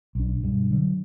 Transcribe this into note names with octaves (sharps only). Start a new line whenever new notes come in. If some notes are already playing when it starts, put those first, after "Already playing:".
B1 D4
G2 B2
D3 F#3